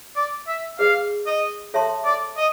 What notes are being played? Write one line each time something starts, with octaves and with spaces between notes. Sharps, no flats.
D5
E5
G#4 B4 D#5 F5
D#5
A4 C#5 E5 A5 C6
D5
D#5